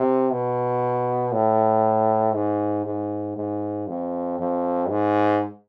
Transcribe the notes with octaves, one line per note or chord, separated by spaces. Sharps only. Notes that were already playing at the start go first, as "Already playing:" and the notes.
Already playing: C3
B2
A2
G#2
G#2
G#2
F2
F2
G#2